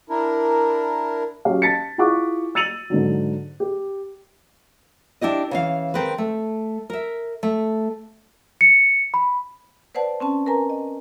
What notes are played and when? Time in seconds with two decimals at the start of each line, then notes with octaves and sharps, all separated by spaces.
0.09 D4 E4 A#4
1.45 F#3 C#4 G4 F5
1.62 A5 A6 B6 C#7
1.98 E4 F4 G#4 F#5 C#6 D6
2.55 E6 A6 C#7 D#7 F7 F#7
2.90 G#2 D3 F#3
3.60 G4
5.21 D4 E4 G4 D#5
5.51 C#3 E3 F5
5.94 D#3 C4 G#4 B4
6.18 A3
6.90 A#4 E5
7.43 A3
8.61 C#7
9.14 B5
9.95 B4 C5 D5 F#5 A5
10.20 C4 C#4 A5
10.46 A#4 B4 G#5 A#5
10.70 D#5